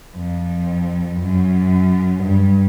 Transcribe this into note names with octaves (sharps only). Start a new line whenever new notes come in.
F2
F#2
G2